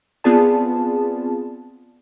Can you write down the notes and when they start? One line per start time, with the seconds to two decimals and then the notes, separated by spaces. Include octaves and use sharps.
0.24 B3 C4 F4 G#4 D5 A5